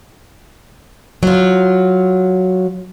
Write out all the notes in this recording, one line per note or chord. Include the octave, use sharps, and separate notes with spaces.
F#3 F4